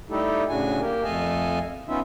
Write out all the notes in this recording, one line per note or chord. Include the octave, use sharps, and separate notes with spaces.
G3 A3 D#4 E4 G4 A4
A2 C#3 D4 F#4 G#5
A#3 G4 A#4
F2 A3 D#5 F5 G#5 A5
B3 C#4 D#4 F4 E5